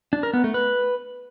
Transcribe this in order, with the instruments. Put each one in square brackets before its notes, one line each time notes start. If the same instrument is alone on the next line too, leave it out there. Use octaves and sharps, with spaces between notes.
[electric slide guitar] D4
A#4
B3
A3
B4